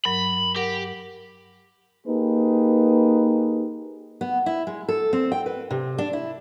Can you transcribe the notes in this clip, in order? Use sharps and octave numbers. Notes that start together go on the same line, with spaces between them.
G2 F#3 A#4 B5
G4 A#4 F#5
A#3 D#4 G4 G#4 B4
B3
E4
G#3
A4
C4
G5
B4
C3
D4
E4